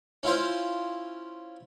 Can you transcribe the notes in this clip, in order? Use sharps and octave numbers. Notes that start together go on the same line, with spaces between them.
C#4 E4 F4 C5